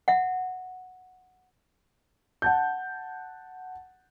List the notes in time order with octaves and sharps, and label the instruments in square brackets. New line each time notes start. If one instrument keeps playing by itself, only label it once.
[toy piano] E5 F#5
[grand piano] F#5 A5 G6